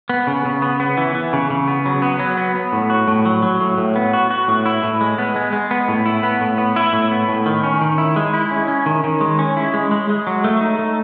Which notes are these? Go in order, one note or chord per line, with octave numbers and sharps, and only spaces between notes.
B3
C#3
C#3
B3
B3
E3
E3
C#3
C#3
B3
F#3
B3
F#3
B3
B3
A2
F#4
A2
F#3
F#3
A2
A2
B3
F#4
F#4
A2
E4
A2
G#3
B3
G#3
G#3
B3
A2
E4
B3
A2
B3
E4
A2
B3
A2
D#3
C#4
D#3
E4
G#3
E4
C#4
C#4
D#3
D#3
G#3
C#4
E4
G#3
G#3
G#3
F#3
A3
D#4
A3